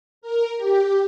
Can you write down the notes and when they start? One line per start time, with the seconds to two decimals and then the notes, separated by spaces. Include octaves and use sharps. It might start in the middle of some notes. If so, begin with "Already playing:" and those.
0.22 A#4
0.57 G4